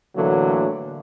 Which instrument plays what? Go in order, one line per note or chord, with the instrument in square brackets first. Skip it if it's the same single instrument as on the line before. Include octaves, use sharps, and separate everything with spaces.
[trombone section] A2 D3 E3 F#3 A3 A#3